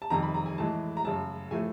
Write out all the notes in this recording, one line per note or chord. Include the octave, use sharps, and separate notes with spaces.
A5
F2 C3 D#3 G3 A#5
B5
A#5
G#5
A2 E3 G#3 A5
A#5
F#2 C#3 F#3 A5
A2 F3 A3 G#5